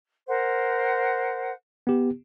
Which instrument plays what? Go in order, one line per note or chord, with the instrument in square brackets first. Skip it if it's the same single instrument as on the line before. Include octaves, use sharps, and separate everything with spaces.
[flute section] A#4 C5 F#5
[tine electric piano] B3 G4